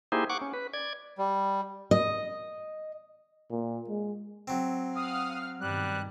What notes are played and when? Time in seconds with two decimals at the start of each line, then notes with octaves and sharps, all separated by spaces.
0.12 A#3 D#4 E4 G4 G#4 C5
0.30 F#5 C#6 D6
0.41 C#4
0.54 B4
0.73 D5 G#6
1.18 G3
1.91 D#5
3.50 A#2
3.89 G#3
4.48 F#3 C4
4.96 F5 F#5 D#6 F6
5.61 G2 B2 D#3 G3 F#6